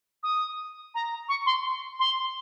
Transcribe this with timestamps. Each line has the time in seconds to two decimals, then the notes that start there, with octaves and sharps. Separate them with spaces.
0.23 D#6
0.94 A#5
1.28 C#6
1.46 C6
1.99 C6